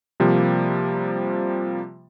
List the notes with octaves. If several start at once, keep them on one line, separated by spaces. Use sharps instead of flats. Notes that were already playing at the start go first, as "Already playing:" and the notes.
C3 F3 G3 A#3